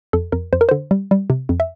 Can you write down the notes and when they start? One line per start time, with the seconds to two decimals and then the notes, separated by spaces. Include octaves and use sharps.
0.13 F2 A4
0.32 F2 A#4
0.53 F2 C5
0.61 A#4
0.69 D3 C5
0.91 G3
1.11 G3
1.30 C3
1.49 F2
1.60 E5